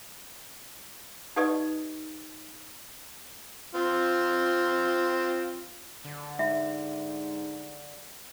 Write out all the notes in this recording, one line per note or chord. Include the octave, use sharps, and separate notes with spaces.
D#4 G4 A4 B4 D5 D#5
C4 F4
D3
G#2 E5